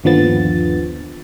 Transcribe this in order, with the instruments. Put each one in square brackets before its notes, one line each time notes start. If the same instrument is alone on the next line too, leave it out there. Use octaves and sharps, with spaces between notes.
[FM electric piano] G1 D#2 D3 F3 B3 A6